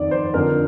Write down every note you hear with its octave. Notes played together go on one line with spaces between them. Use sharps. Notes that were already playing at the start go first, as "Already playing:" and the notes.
Already playing: F2 D#3 D5
C5
F2 D3 F3 A#4